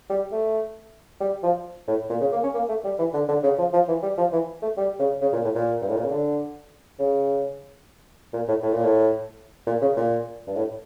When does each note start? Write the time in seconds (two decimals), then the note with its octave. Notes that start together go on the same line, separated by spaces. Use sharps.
0.10 G3
0.32 A3
1.20 G3
1.43 F3
1.88 A2
2.10 A#2
2.21 C#3
2.32 A#3
2.43 C#4
2.54 A#3
2.69 A3
2.84 G3
2.99 E3
3.14 D3
3.28 D3
3.43 C#3
3.58 F3
3.73 F3
3.88 E3
4.03 G3
4.18 F3
4.33 E3
4.62 A3
4.77 G3
4.99 C#3
5.21 C#3
5.33 A#2
5.44 A2
5.55 A#2
5.81 G2
5.89 A2
5.96 A#2
6.03 C#3
6.11 D3
6.99 C#3
8.33 A#2
8.48 A2
8.63 A2
8.73 A#2
8.84 A2
9.67 A#2
9.82 C#3
9.97 A#2
10.47 G2
10.56 A2